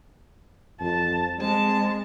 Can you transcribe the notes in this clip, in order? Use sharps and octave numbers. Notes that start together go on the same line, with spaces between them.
F2 A5
G#3 C4 A5